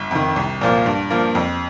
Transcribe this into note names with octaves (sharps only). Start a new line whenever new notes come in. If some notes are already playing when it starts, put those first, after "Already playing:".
Already playing: G1
F2 D#3
C2
A#2 F3 A#3 F4
G2
F3 A#3
F2